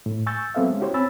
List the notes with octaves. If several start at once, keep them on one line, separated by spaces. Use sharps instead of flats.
A2
G#5 C#6 E6 G6 A6
F#3 B3 C4 A4 E5 F5
G#3 C#4
C#4 E4 F#4 G4 C5 C#5
C4 C#5 G#5 B5 E6 A6